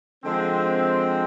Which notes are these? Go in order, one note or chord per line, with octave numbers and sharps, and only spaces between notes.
D3 F3 G#3 C4